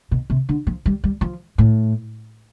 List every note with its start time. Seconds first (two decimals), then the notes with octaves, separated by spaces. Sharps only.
0.11 B2
0.30 C3
0.49 D3
0.67 F3
0.86 G3
1.04 G3
1.21 F3
1.58 A2